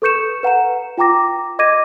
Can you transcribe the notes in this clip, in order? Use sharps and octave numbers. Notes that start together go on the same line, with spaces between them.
A4 B4 C#6 G6 C#7 E7
B4 F#5 A#5 E7
F4 G5 A#5 D6 A#6
D#5 D6 G#6 A#6 D#7